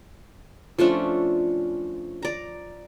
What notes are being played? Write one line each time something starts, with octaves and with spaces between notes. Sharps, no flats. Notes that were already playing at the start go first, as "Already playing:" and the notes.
F3 A3 C#4 D4
D5 A#5